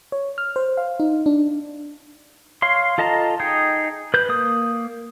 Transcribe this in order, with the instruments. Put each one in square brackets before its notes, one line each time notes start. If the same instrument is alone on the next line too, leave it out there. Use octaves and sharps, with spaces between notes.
[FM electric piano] C#5
F6
C5
F5
D#4
D4
[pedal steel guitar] C#5 F5 C6
F4 A4 D#5 A5 A#5
D#4 G#4 G5
B4 G6
A#3 D#6